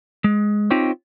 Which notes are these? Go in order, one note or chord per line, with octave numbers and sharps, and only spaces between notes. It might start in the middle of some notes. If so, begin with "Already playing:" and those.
G#3
C4 D#4 F4 G4 C5 C#5